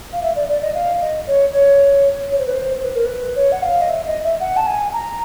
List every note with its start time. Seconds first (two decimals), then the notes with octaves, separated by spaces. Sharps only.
0.13 F5
0.23 E5
0.36 D5
0.49 D5
0.62 D#5
0.75 F5
1.01 D#5
1.27 C#5
1.53 C#5
2.32 C#5
2.39 C5
2.46 B4
2.54 C5
2.84 B4
2.95 A#4
3.05 B4
3.36 C#5
3.52 F#5
3.62 F5
3.81 D#5
3.89 E5
4.06 D#5
4.24 E5
4.40 F#5
4.57 A5
4.67 G#5
4.93 A#5